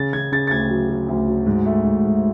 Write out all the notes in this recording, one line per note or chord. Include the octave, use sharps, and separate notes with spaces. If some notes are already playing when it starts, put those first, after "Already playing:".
Already playing: C#3 A6
C#3 G#6
C#3 A6
A6
D2 G#6
F#3
F#3
D2
F#3
G#2
A3
G#2
G#2